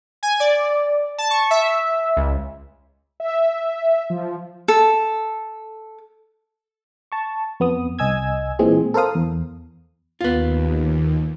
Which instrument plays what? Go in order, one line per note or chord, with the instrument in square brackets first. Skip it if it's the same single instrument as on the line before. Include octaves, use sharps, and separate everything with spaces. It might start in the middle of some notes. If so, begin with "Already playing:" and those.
[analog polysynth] G#5
D5
A5
C#6
E5
C#2
E5
F3
[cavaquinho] A4
[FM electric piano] A5 C#6
F2 B3 D#6
C2 D#5 G#5 E6 G#6
A#2 E3 G#3 C4 G#4
A4 A#4 C5 F5 D#6
E2
[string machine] D#2 [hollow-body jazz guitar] B3 F4